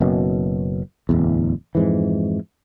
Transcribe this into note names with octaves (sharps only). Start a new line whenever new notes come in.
F#1 F#2 B2
D1 G1 E2
F2 G#2 E3